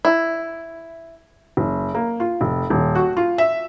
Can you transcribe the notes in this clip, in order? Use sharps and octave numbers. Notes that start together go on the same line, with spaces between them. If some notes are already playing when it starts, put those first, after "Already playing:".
E4
F#1
A#3
F4
F1
D#1
F#4
F4
E5